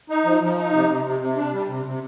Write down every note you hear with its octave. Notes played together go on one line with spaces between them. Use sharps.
D#4
F3
F3
D#4
C3
C3
C3
C3
D4
G3
C3
C3